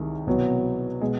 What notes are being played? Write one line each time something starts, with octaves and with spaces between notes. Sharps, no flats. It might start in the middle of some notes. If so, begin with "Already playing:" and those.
Already playing: C2 C3 D#3 G#3
C2 B2 F#3 B3
B2 G#3